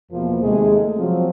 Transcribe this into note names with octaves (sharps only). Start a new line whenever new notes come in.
E2 B2 F3 A#3
D#2 C3 G#3 A3 G#4
F3 F#3 C4